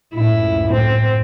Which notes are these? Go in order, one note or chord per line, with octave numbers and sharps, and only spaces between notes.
C#2 F#2 A2 E4
C4